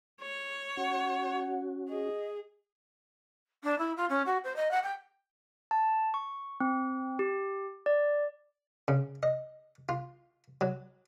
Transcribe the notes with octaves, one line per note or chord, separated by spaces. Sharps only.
C#5
C#4 F#4 F#5
G#4 D#5
D4
E4
F4
C#4
F#4
C5
D#5
F#5
G5
A5
C#6
C4
G4
D5
C#3
D#5
F4
F#3